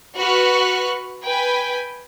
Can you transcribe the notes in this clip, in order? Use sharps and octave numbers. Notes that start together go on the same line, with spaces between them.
F#4 B4 F#5 C#6 F6 F#6
B4 G5 G#5 B5